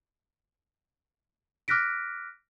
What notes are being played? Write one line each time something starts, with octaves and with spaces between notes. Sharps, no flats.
D6 F6 F#6 A#6 B6 D7